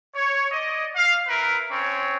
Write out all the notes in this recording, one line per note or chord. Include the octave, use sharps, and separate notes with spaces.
C#5
D5 D#5
F5
E4 A#4 B4
C4 C#4 C#5